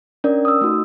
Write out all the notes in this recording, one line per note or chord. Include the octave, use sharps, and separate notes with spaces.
C#4 D4 A#4 D5
D#6 E6
A3 D#4 F#4